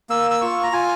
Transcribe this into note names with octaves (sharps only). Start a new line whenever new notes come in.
A#3 E6
E6
F4 C#6
A#5
F4 G#5